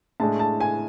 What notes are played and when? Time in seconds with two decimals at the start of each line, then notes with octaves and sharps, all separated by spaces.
0.20 A2 G#3 D4 A5
0.39 A5
0.60 G#5